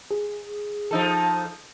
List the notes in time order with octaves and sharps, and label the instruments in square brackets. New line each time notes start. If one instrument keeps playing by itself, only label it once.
[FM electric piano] G#4
[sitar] F3 D#4 A4